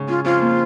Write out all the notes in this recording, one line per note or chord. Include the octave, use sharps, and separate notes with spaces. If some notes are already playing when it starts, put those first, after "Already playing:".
Already playing: G#2 C#3
C#4 F4
F2 F4
A#3